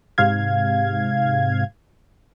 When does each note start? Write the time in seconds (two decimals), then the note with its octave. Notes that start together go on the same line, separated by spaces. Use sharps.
0.18 G#2 C3 F5 G#6